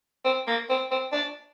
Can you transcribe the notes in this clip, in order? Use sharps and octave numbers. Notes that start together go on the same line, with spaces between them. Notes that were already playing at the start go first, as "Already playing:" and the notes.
C4
A#3
C4
C4
D4